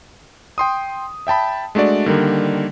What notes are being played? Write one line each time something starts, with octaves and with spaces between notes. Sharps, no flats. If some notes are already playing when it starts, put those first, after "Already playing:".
G5 C6 D#6
E5 G5 A5 B5
G#3 A3 D4 F#4 D5
D3 D#3 G3 A#3